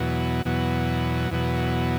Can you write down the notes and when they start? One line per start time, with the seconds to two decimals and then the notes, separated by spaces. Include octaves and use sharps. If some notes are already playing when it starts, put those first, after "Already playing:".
Already playing: E2 B2 F#3
0.45 E2 B2 F#3
1.31 E2 B2 F#3